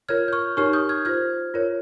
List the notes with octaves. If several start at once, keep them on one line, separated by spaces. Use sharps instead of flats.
F4 A#4 C#5 F6 G#6
G6
C#6 F6
D#4 G4 A#4 C#5 C#6 F6
D#6 G6
F6 G#6
F4 C5 F6 G#6
F4 A#4 C#5